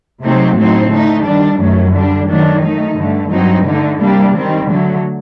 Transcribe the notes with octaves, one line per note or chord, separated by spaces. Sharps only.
C3 F#3 A3 C4 D#4
A2 F#3 C4 D#4
D3 A3 D#4
D#3 G3 D4
F#2 D#3 F#3 A3
D3 G3 D4
D#3 F#3 A3 D4
D#3 A3 D#4
G2 D3 A3
G2 F#3 C4 D#4
D3 A3 D#4
C3 G3 A#3 D4
D#3 G3 C4
D3 F#3 A3